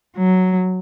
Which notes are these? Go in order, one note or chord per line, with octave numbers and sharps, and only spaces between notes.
F#3